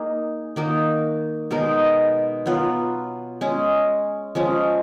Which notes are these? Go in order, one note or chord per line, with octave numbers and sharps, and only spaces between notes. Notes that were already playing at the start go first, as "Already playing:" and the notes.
Already playing: A#3 D#4 G#4
D#3 A#3 D#4 F#4
B2 G#3 D#4 A#4
F#3 B3 F4 B4
G#3 C#4 G#4
F3 G#3 C#4